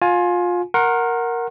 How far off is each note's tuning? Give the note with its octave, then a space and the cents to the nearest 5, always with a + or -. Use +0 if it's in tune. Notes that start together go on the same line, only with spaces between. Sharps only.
F4 +20 G#5 +20
A#4 +0 F#5 +0 C6 +45